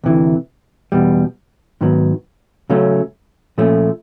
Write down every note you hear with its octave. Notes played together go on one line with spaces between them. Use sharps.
D2 C3 E3
E2 B2 G3
G#2 D#3 F#3 B3
C#3 F#3 A3 C#4
A#2 F3 A3 C#4